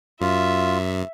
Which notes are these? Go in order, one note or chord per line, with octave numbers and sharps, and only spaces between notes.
F#2 F4 E5